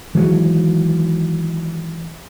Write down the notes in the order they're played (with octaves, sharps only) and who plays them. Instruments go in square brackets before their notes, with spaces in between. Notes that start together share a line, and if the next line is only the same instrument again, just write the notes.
[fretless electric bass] D#3 E3 F#3 G#3